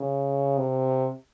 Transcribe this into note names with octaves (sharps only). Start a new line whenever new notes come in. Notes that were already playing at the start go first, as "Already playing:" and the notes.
Already playing: C#3
C3